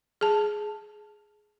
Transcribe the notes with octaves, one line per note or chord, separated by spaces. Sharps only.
G#4 A5